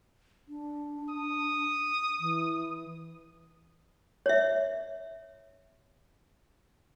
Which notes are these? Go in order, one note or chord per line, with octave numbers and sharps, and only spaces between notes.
D4
D#6
E3
C#5 E5